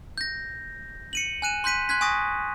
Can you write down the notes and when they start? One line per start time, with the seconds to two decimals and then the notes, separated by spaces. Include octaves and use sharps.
0.18 G6 A#6
1.13 C#7 D#7 F#7
1.42 G#5 F#6 D#7 E7
1.64 C6 F#6 G6 B6 D#7
1.89 C6 F#6 G#6 B6
2.01 G#5 C#6 D#6 A#6